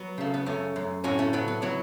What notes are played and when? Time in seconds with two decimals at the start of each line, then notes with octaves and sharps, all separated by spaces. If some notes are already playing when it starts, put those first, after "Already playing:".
Already playing: F#3 B3
0.18 C#3 A3
0.34 B3
0.46 F#2 A3 C#4
0.76 F#2
1.04 A2 C#4 F#4
1.19 A3 C#4
1.33 F#3 B3
1.48 B3
1.62 F#3 B3 E4